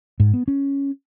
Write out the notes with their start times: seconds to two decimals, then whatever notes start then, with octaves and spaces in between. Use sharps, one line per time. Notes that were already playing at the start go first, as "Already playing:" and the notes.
0.20 G#2
0.34 B3
0.48 C#4